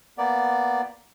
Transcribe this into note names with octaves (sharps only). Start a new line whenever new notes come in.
A#3 B3 D5